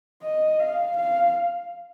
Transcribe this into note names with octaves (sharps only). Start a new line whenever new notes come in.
D#5
F5
F5